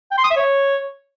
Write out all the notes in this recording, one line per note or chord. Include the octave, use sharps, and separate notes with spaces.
G5
C6
D#6
E5
C#5